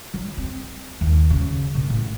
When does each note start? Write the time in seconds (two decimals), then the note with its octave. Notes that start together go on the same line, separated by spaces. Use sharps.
0.14 F#3
0.38 C4
1.01 D#2
1.30 C#3
1.75 A#2
1.90 A1